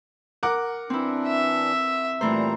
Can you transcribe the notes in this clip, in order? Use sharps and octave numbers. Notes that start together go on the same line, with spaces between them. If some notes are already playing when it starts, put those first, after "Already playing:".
A#4 F#5 D6
E3 C4 D4 E4
E5
A#2 E3 G3 A3 C5 A#5